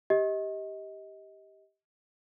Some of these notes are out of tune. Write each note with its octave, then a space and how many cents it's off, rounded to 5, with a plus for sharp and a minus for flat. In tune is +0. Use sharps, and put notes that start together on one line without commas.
G4 +0 D#5 +25